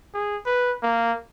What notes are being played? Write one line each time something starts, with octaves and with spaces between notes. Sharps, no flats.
G#4
B4
A#3